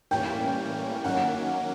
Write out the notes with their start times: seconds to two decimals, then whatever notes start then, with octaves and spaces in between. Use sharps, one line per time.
0.11 A2 E3 G3 A#3 C#4 G5
1.04 D#3 F#3 A#3 C#4 F#5